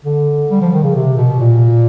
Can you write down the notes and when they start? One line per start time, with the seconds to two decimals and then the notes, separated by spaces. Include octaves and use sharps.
0.05 D3
0.51 G3
0.61 F3
0.73 D#3
0.83 C#3
0.95 C3
1.17 B2
1.40 A#2